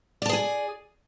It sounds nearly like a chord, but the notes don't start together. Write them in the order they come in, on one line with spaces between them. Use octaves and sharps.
D5 A5 G#4 G#5